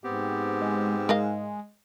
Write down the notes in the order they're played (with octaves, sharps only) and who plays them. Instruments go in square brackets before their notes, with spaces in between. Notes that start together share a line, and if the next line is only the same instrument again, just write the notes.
[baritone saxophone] G#2 [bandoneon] B3 C4 G4
[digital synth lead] G#3
[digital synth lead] G#3 [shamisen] A#4 D#5 F5